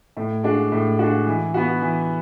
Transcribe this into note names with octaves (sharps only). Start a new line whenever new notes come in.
A2
G#3 D4 F#4
A2
G#3 D4 F#4
E3
B3 F#4
E3